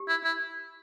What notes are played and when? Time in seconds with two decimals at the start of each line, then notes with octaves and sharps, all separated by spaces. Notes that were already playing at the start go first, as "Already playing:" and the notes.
Already playing: G4
0.08 E4
0.24 E4